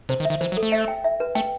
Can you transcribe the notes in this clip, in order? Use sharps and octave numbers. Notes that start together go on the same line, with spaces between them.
C3 C5
D#3
E5
D#3
E3 C5
F#3
A4
A3
E5
G5
E5
B4
A3 G5